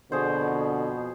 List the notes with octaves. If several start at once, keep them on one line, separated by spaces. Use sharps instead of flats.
F2 B2 D3 F#4 G#4 C5